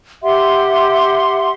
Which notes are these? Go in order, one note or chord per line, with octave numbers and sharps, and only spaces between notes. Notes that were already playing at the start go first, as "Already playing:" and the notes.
G4 E5 F#5 C6